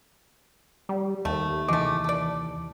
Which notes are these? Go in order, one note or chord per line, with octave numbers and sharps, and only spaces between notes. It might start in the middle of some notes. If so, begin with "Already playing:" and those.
G3
D#2 A3
C2 E3 G#3 A3 D6
A4 D5